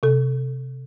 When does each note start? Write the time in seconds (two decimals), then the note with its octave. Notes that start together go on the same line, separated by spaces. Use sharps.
0.03 C3 A4